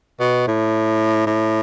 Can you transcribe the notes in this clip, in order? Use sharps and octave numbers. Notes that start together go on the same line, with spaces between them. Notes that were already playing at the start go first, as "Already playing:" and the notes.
B2
A2
A2